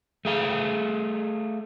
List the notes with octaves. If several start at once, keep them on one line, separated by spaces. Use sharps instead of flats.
A3 G#4 F5